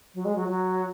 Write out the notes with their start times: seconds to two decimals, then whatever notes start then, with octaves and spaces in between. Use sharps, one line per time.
0.14 F#3
0.24 G#3
0.35 F#3
0.48 F#3